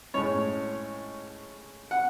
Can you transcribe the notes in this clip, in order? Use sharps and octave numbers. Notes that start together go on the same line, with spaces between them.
A2 G#3 C#4 C#5
F#5